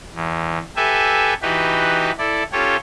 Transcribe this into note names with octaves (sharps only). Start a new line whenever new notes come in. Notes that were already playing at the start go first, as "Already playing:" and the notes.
E2
G4 A4 B4 E5 G#5
E3 D#4 F#4 G4 B4
E4 A4 D5
C#4 F4 G4 A4 C#5